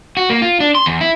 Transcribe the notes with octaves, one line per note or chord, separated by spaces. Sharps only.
F#4
A#3
F4
D4
C6
E2
E4